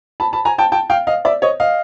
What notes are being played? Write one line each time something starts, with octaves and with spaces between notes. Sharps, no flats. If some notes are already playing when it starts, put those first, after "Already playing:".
A5 B5
A5 B5
G#5 A#5
G5 A5
G5 A5
F5 G5
D#5 F5
D5 E5
C#5 D#5
D#5 F5